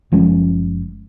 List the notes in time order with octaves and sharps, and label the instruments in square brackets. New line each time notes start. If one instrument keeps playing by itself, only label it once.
[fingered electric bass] F#1 F3 G#3 C#4